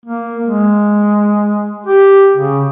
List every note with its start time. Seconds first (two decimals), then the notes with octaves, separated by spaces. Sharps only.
0.05 A#3
0.43 G#3
1.86 G4
2.37 C#3